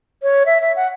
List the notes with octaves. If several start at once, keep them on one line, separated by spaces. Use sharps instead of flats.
C#5
E5
E5
F#5